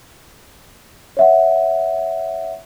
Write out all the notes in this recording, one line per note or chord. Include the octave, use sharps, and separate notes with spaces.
C#5 E5 F#5